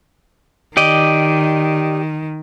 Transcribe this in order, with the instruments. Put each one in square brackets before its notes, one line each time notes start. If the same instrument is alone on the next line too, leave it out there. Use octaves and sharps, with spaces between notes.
[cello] D#3 [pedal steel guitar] G4 D5 D#5